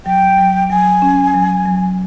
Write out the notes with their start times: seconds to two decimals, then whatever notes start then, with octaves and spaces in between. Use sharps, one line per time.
0.06 F#3 G5
0.38 F#3
0.70 F#3 G#5
1.02 C#4
1.34 F#3
1.66 F#3